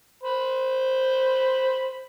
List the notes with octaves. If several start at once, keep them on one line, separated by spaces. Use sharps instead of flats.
C5 B5